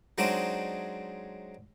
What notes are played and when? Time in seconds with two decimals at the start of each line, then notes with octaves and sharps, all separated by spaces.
0.18 F#3 G#3 C4 D4 D#4 F#4